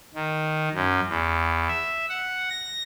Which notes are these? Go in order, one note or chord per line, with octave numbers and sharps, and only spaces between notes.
D#3
F#2
E2
E5
F#5
A#6